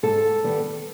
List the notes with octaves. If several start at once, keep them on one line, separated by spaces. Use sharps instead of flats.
G#2 A4
D#3 G3 B3